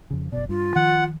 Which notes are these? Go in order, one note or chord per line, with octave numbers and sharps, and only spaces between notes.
F2 C#3
F#1 B2 D5
G2 F4
D#3 F3 F#5